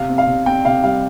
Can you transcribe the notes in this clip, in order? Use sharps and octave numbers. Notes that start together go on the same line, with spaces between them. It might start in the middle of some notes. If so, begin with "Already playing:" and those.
Already playing: C3 F5
C4
F5
C3
C4 G5
C3 F5
G3 F5